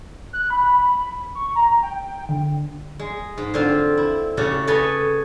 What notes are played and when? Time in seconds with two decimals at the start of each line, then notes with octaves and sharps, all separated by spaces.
0.33 F#6
0.50 B5
1.35 C#6
1.55 A#5
1.83 G5
2.29 D3
2.99 G#3
3.38 G#2
3.54 D3 C4 F4
3.97 E4
4.37 C#3 C#4 F#4 G4 A4
4.67 A4 B4 C#5 D#5 G5 G#5